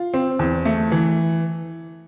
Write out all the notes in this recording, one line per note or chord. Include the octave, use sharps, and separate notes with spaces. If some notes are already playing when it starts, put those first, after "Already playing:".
Already playing: F4
C4
E2
A3
E3